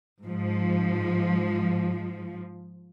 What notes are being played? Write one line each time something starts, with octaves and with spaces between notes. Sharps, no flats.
G#2 F3